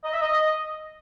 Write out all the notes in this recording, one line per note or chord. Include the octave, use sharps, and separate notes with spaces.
D#5
E5
D#5